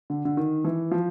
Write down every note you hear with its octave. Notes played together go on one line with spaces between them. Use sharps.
D3
D3
D#3
E3
F3